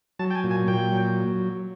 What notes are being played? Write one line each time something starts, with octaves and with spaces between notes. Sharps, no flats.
F#3 A5
G5
G#5
A#2
G#5
A#2 G5
F#3